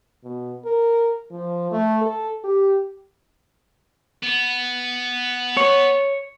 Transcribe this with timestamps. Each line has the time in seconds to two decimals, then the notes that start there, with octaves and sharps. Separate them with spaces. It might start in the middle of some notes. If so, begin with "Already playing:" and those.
0.24 B2
0.64 A#4
1.31 F3
1.71 A3
2.01 A4
2.44 G4
4.23 B3
5.57 C#5